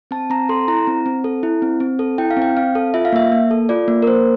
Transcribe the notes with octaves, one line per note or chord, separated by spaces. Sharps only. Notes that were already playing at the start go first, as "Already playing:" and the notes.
C4 A5
C4 A#5
A4 C6
E4 A#5
C4
C4
A4
E4
C4
C4
A4
E4 G5
F5
C4 G5
C4 F5
A4
F4 E5
F5
A#3 E5
A#3
A4
F4 D5
A#3
A#4
A#3 C5